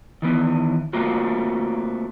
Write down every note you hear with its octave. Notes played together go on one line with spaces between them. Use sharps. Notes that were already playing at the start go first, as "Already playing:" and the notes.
D#3 E3 B3
A3 A#3 C4 F4 F#4